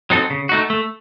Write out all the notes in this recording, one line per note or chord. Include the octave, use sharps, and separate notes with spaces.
F#3 C4 D#4 A4
C#3
A3 D#4 F#4
A3